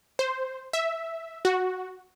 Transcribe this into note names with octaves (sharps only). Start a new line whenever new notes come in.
C5
E5
F#4